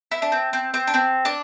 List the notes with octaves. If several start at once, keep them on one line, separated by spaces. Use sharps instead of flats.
E4
D4
C4
C4
C4
D4
C4
D4